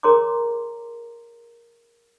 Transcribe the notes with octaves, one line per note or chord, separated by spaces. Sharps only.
G#4 A#4 C#5 A#5 C6 D6